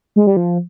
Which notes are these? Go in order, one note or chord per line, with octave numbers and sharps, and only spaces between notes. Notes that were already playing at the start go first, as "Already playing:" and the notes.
G#3
G3
F3